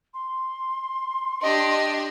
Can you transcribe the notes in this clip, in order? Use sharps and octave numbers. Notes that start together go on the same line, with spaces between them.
C6
D4 G4 D#5